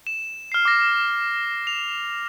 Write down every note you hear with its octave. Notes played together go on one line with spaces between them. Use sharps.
E7
F6 C7
D6 A#6
F7